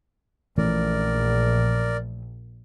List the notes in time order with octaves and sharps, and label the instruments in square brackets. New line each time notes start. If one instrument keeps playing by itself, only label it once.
[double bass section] A#1 [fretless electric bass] E3 A3 C#4 [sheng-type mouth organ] A#4 D5